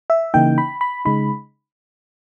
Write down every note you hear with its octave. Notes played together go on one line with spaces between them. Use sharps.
E5
C#3 E3 A#3 D#4 G5
B5
B5
C#3 G#3 D#4 B5